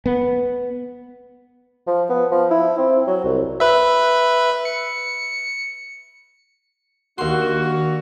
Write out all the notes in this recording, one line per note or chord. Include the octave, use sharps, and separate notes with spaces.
B3
F3
B3
F3
E4
C4
F#3
C2
B4 E5
C#7
D#2 A#3 D4 F#4 C6